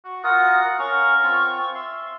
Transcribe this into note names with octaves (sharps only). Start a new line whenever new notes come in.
F#4
F4 F#4 A#4 F#5 D#6
C#4 A#4 F5 C#6
C4 F4
E5 C6